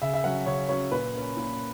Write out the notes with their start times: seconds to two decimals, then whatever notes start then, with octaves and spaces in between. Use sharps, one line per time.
0.02 C#3 E5
0.14 E5
0.24 F#3 C#4 F#5
0.46 C#3 C#5
0.69 F#3 C#4 C#5
0.91 A#2 B4
1.14 A#3 C#4
1.37 A#2